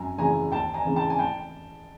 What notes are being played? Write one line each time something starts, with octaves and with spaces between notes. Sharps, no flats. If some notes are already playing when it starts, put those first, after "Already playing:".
Already playing: F#2 G#5 A#5
C#3 E3 G#5 A#5
D#2 G5 A5
G#5 A#5
C#3 E3
G5 A5
G#5
G5 A5